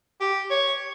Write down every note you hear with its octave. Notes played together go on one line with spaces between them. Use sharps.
G4
C#5